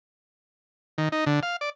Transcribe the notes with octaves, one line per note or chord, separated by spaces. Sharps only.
D#3
D#4
D3
F5
D5